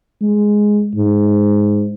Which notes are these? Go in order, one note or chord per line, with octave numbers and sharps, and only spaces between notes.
G#3
G#2